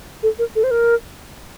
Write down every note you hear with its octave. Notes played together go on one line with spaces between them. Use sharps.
A4
A#4
A4
C5
A#4